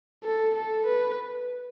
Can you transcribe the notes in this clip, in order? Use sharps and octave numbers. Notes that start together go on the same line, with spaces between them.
A4
A4
B4